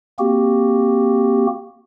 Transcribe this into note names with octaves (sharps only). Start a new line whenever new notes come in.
A#3 C4 F#4 G4